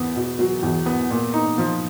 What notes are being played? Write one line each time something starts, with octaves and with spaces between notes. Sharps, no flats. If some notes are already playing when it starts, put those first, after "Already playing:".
Already playing: E2 B3
B2
F#3
E2
B3
A#2
D#4
F3